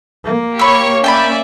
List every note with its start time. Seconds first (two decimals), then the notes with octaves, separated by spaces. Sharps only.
0.25 A#3
0.59 G4 C#5 B5 C#6 E6
1.04 C#4 D5 E5 G5 A5 B5